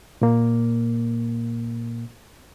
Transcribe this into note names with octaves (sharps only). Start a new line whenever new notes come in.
A#2 A#3